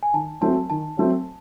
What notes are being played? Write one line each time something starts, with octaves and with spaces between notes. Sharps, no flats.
G#5
D#3 A5
F#3 A3 C4 A5
D#3 A5
F#3 A3 C4